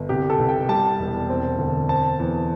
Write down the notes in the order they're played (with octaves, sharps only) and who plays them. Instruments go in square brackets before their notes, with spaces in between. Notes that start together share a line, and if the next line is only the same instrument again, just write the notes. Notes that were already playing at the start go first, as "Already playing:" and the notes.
Already playing: [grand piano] G1
C2 G4
A4
C2
G5
G3 A5
E1
C4
D2
C4 A5
E2